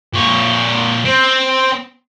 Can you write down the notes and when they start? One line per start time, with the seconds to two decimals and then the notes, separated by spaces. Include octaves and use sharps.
0.13 A#2 C#5
1.05 C4